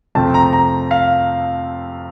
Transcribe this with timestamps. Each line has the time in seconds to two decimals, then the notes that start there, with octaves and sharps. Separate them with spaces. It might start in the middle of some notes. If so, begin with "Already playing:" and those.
0.15 F2 C3 F3 A3 C4 A5
0.34 A#5
0.53 A#5
0.91 F5